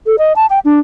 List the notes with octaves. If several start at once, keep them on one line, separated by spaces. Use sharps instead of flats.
A4
D#5
A5
G5
D4